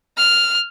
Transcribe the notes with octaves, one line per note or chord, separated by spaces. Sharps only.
F6